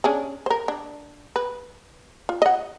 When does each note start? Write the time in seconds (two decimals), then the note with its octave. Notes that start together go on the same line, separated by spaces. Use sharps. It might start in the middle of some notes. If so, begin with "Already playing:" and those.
0.04 C#4 D4 G#4
0.46 A#4 C5
0.68 D4
1.36 B4
2.29 F4
2.42 D#5 F#5